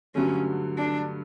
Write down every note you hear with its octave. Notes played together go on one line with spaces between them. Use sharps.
G2 D3 F#3 A3 C#4
D4